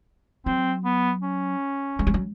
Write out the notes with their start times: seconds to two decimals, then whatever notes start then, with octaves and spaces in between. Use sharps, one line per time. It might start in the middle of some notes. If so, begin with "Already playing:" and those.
0.46 F#3 C4
0.85 B3
1.22 C#4
1.99 G#3
2.07 G3
2.14 F#3